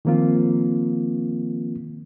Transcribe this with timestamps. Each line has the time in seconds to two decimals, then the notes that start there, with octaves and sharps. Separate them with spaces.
0.05 D#3 F3 A#3 C4 F4